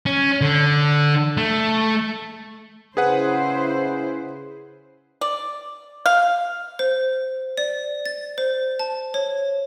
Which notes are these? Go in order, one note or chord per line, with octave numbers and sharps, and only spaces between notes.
C#4
D3
A3
C#3 E4 G#4 B4 C5 F#5
D5
F5
C5
D5
A6
C5
A5
C#5